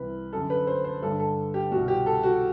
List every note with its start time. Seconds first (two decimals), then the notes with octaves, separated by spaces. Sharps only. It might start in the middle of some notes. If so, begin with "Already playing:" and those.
Already playing: C2 C3 E3 B4
0.33 F#2 D3 A4
0.50 B4
0.67 C5
0.84 C5
1.02 G2 D3 A4
1.20 A4
1.54 G4
1.71 C2 B2 F#4
1.88 G4
2.06 A4
2.23 F#4